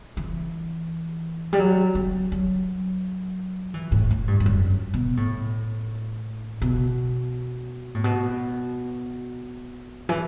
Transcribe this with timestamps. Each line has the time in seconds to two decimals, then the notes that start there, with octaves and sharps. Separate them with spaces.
0.17 E3
1.53 G3
1.59 F#3
1.95 F#3
2.32 F#3
3.74 E3
3.92 A2
4.11 A2
4.28 G2
4.40 G2
4.46 F#2
4.94 B2
5.17 A2
6.62 B2
7.95 A2
8.04 B2
10.09 E3